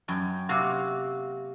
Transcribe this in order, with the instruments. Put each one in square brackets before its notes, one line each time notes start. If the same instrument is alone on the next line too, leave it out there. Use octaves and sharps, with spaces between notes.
[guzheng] F#2 G5
C3 A#3 F#4